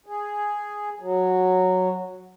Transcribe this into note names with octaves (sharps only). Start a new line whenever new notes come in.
G#4
F#3